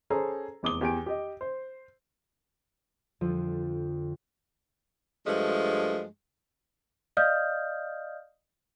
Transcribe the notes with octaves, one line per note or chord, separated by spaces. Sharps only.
C#4 G#4 A4 C5 A#5
F1 E2 D6 D#6 G7
E2 G4 G#5 D7
G4 D#5
C5
F2 D3 F3
G2 F3 G#3 A3
D5 D#5 F5 D#6 F6 G6